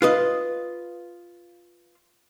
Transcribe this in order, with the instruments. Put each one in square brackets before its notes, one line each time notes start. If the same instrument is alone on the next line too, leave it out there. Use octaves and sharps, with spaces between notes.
[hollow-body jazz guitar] F4 B4 D#5